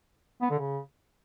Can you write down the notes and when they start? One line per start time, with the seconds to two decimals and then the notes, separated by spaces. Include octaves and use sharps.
0.42 B3
0.50 D3
0.59 C#3